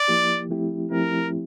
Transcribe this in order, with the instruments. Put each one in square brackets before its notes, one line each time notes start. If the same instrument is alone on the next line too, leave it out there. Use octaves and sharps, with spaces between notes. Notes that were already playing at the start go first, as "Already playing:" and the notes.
Already playing: [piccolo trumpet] D5
[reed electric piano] F3 A#3 E4 G4
F3 A3 C4 E4 G4
[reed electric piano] F3 A3 C4 E4 G4 [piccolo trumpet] A#4